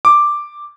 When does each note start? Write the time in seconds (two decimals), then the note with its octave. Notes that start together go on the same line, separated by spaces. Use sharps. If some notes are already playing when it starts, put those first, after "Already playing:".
0.05 D6